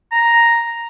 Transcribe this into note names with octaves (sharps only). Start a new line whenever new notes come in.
A#5